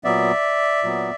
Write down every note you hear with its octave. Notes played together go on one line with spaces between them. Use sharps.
A#2 F#3 B3 D5 E5
A#2 F#3 B3